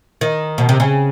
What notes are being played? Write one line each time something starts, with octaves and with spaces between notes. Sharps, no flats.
D#3
B2
C3
C#3